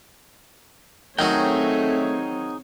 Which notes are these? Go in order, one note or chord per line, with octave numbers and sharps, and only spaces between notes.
D#3 F#3 A3 C4 D#4 G#4 C#5 G5